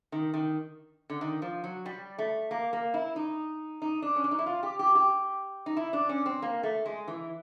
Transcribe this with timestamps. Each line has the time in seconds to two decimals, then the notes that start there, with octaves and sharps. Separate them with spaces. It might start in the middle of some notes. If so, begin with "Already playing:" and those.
0.12 D#3
0.34 D#3
1.10 D3
1.21 D#3
1.42 F3
1.64 F#3
1.86 G3
2.18 A3
2.51 A#3
2.73 A#3
2.94 E4
3.16 D#4
3.82 D#4
4.02 D4
4.16 C#4
4.24 D4
4.31 D#4
4.39 E4
4.46 F4
4.63 G4
4.79 G4
4.95 G4
5.66 D#4
5.77 E4
5.93 D4
6.09 C#4
6.26 C4
6.42 A#3
6.63 A3
6.86 G#3
7.08 E3